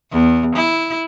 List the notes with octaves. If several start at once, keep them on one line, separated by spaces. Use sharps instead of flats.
E2
E4